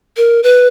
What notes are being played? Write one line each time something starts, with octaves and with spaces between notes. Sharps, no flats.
A#4
B4